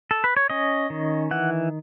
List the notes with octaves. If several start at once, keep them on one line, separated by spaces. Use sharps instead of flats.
A4
B4
C#5
C#4 D#5
D#3
E3 F#5